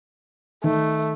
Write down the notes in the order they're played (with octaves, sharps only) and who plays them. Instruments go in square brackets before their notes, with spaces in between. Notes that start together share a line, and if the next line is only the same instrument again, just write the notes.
[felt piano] D#3 [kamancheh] A3